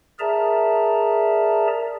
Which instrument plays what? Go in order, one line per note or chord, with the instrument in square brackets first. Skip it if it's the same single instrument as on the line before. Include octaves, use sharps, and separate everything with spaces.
[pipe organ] G#4 A#4 D5 E5 A5 A#5